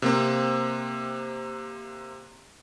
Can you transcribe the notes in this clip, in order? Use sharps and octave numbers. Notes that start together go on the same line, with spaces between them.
C3 A#3 C4